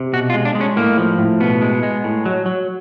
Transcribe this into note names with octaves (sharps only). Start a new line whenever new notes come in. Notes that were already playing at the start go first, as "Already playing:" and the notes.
Already playing: C3
B2 F#4
F4
G#3
D4
G#3
C#4
A2 A#3
F3
A2
B2 B3
G#3
G#3
A2
F#3
F#3